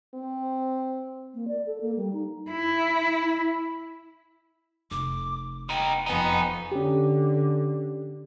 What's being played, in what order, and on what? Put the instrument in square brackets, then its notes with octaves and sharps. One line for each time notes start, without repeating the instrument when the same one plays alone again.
[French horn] C4
[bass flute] A#3
D5
A4
A#3
G3
D#4
[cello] E4
[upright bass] F1 [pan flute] D6
[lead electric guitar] B3 D#4 [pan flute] G5
[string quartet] F2 B3 [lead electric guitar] D#4 [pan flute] G#5
[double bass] D3 [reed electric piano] C#4 G4